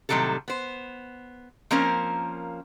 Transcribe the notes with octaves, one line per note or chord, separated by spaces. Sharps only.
A2 C3 D#3 F#3 G3 A4
B3 C5
F3 A#3 C4 C#4 A#4